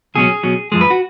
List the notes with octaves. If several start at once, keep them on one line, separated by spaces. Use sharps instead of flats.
C#2 B2 F#3 C#4 G#4
B2 F#3 C#4
F#2 F3 G#3 G#4
B4
F#4